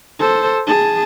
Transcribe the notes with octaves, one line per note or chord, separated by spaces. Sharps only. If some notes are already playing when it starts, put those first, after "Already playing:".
A4 C5
G#4 A5